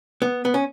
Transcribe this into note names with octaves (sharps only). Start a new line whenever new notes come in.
B3
B3
C#4